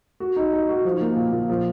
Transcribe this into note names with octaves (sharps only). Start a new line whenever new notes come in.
F#4
D#4
D#4
F#4
F3
A#3
A#2
A#2
F3